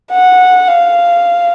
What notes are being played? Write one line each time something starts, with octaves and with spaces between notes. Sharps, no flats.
F#5
F5